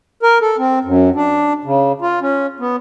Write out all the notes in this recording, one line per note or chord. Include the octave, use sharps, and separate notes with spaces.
A#4
A4
C4
F#2
D4
C#3
F4
C#4
B3